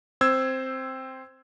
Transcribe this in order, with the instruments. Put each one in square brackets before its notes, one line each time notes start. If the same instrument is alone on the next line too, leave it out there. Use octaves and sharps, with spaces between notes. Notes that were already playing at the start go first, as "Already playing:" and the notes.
[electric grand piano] C4 C5 E6 G#6